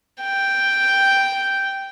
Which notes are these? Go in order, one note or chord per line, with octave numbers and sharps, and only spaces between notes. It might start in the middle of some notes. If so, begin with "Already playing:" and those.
G5